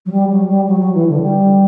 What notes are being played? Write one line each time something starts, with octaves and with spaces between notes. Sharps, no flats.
F#3
G3
F#3
G3
F#3
F#3
E3
D3
G3